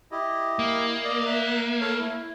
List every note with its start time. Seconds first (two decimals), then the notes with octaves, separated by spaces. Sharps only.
0.12 E4 G4 D#5
0.59 A#3
1.04 D5 D#5
1.26 E5 A#5 F#6
1.81 A4 A#4 C#5
1.99 E4